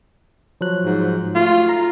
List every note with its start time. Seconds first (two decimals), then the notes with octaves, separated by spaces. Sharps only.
0.61 F3 F#3 F#6
0.85 G#2
1.35 A3 F4 F#4
1.69 A#5